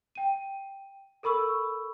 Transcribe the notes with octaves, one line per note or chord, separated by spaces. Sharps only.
G5 D#7
A4 A#4 B5 C#6 E6